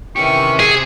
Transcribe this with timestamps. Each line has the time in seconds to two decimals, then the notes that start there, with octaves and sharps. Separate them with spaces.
0.16 C3 D#3 E3 C#4 G4 C#6
0.60 G#4